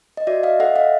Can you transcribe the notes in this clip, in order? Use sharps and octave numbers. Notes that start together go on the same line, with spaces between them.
D#5
F#4 D5 E5
D#5 F5
A4 E5 F#5
D#5 F5